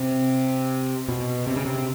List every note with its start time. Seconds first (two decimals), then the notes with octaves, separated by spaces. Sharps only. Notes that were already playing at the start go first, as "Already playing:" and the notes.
Already playing: C3
1.09 B2
1.47 C3
1.56 C#3
1.65 C3